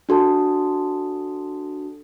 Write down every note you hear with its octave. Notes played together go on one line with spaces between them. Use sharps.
D4 F#4 A4 A5